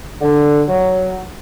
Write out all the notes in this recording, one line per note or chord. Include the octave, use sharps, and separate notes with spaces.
D3
F#3